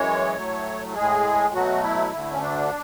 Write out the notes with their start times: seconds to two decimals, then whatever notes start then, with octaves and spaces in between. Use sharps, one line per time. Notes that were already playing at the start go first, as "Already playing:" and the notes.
Already playing: F#2 E3 G#3 C#5
0.36 A2 F#3 A3
0.95 A2 G#3 G#4
1.53 B2 F#3 A3 F#4
1.83 E4
2.12 D2 D3 A3
2.31 C#4
2.42 D4